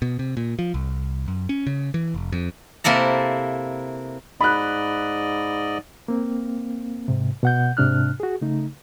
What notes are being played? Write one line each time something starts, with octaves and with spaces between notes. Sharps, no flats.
B2
C3
A#2
F3
C2
F#2
C#4
C#3
E3
F1
F2
C3 A#3 E4 A4 A#5
G#2 D5 D#5 B5 F#6
A#3 C4
G#2 C3
B2 F#5 G6
G#2 C3 D4 F6 F#6
F#4 G#4
C#3 A3 D#4